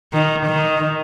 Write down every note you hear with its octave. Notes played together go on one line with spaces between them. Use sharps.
D#3
D#3